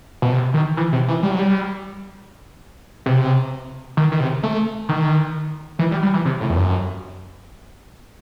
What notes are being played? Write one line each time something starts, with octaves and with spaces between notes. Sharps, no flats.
B2
C3
D#3
E3
C3
E3
G3
F#3
G3
C3
D#3
D#3
C3
A3
D#3
E3
G3
G3
E3
C3
A2
E2
F#2